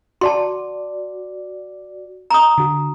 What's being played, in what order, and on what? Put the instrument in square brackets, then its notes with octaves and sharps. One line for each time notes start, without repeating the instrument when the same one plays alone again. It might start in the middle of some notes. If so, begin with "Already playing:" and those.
[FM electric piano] F#4 D5 [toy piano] A5 C6
[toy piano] A#5 D#6
[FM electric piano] D3 F#4